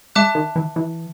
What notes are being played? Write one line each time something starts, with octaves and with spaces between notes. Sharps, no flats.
G#3 E5 A5 D6 F#6
D#3
E3
E3